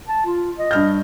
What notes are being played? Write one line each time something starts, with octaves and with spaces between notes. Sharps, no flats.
A5
F4
D#5
G2 F6 G6